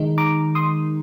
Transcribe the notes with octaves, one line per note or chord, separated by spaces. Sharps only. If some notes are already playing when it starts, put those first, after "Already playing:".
Already playing: D#3 G#3 D#4
A#5 D6
C6 D#6